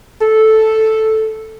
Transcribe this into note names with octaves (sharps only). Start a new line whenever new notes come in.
A4